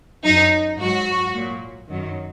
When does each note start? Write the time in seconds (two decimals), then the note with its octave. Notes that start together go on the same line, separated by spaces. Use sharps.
0.24 F#2 F#3 D#4
0.78 G#2 F#3 F#4
1.34 A#2 F#3
1.88 F#2 D#3 F#3